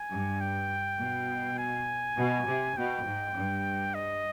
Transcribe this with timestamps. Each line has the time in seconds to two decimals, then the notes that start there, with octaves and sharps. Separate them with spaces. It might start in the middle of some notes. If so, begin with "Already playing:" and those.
Already playing: G#5
0.11 G2
0.40 G5
0.99 B2
1.58 G#5
2.18 B2
2.47 C3
2.77 B2 G5
3.06 G#2
3.36 G2
3.95 D#5